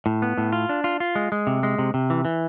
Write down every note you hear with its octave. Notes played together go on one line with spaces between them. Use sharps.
A2
B3
A2
F4
D4
F4
F4
G#3
G#3
C3
G#3
C3
C3
E3
E3